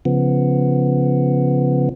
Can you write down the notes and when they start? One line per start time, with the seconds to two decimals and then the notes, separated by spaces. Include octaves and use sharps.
0.05 C#3 F3 B3